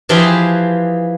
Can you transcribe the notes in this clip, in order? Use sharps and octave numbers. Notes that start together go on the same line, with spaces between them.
E3 F3 G4 G#4 B4 C5